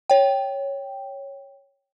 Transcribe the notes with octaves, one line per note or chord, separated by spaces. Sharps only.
C#5 G5